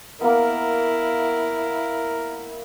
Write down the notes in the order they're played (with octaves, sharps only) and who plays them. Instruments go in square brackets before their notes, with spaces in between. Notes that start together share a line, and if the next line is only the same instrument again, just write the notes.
[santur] A#3 B3 [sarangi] E4 [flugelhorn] A#4